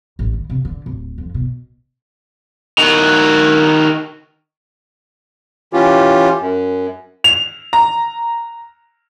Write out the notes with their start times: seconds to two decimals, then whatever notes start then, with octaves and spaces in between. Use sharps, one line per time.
0.19 A1
0.33 D#3
0.50 C3
0.65 D3
0.86 D1
1.18 F2
1.34 B2
2.78 D#3 F#4
5.73 E3 C#4 F4 G4
6.41 F#2
7.24 F7
7.73 A#5